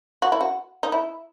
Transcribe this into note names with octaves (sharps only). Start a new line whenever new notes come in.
F#4
E4
F#4
D#4
E4